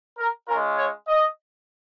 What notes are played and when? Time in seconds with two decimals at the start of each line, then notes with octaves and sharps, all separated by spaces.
0.18 A#4
0.48 G#3 C#4 F4 A#4
0.78 C#5
1.08 D#5